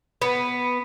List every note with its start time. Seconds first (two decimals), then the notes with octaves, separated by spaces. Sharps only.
0.22 B3